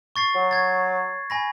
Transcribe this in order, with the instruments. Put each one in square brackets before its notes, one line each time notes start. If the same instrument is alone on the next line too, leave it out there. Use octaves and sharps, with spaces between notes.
[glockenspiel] C#6 A6 C7
[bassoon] F#3
[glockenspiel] G#6 A6
G#5 B5 A#6